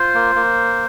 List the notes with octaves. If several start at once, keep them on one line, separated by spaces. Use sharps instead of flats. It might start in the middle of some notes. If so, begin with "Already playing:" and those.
Already playing: F4 C5
A#3
A#3